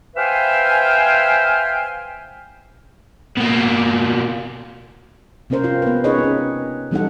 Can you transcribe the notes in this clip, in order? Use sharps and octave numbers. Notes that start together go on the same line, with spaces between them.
B4 C5 E5 F5 G5 G#5
B2 A#3
C3 C4 C#4 A#4 C5
C4 F4
B3 B4
C#4 D#4 G#4 B4 C#5 D#5
C4 C#4
E3 G3 C4 D#4 A4 F#5